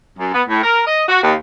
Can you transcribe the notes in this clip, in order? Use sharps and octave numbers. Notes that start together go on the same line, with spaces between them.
F#2
B3
A2
A#4
D#5
F#4
D#2